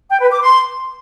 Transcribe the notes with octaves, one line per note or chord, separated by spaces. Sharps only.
G5
B4
D6
C6